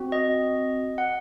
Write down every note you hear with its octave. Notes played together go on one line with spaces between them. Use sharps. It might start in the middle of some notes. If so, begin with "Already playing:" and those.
Already playing: C4 F#4
D#5
F#5